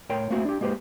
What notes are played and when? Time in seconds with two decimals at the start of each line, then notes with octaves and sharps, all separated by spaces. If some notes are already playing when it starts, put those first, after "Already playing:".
0.09 A2 A#4 C#5 G5 C6
0.30 A3 A#3 C4 E4 F#4
0.45 D4 G4
0.61 G#3 A#3 G4 B4 C5